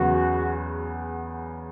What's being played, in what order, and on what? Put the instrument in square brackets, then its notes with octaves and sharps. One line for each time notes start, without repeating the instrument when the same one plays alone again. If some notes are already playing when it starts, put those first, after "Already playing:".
Already playing: [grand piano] E2 C#3 F#3 B3 [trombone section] F#4